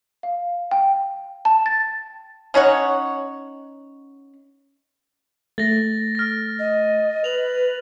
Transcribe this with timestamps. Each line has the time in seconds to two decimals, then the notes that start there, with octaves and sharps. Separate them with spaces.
0.23 F5
0.71 G5
1.45 A5
1.66 A6
2.54 C#4 D#4 C#5 F#5
5.58 A3 A6 A#6
6.15 F6 A#6
6.59 D#5
7.24 B4 F7 F#7